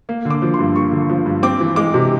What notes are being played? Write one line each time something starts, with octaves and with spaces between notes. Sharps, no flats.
A#3
D3
D6
F3
G2 C6
A#3 C#6
D3
F3
G2
C4 D6
E3
G#3 D6
C3